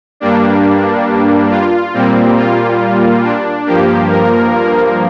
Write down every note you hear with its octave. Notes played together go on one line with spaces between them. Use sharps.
G2 G3 A#3 D4
F4
A#2 G3 A#3 C4
F4
D4
G2 F3 A#3 G4
A#4